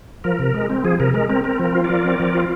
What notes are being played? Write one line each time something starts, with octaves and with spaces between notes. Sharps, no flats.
F3 A#4
C3
G#3
C4
F3 G#4
C3 A#4
G#3 A#4
C4 A#4
C4 A#4
F3 A#4
F4
A#4 D5
F3
C4
F3
F4